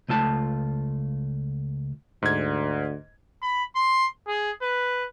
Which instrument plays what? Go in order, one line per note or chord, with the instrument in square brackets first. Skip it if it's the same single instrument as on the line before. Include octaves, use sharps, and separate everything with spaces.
[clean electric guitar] C#2 A3 F4 A5
[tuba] D2 [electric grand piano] G#2 G#6
[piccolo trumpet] B5
C6
G#4
B4